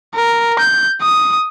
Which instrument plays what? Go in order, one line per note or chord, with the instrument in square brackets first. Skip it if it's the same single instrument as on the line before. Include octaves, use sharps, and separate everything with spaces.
[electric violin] A#4
G6
D#6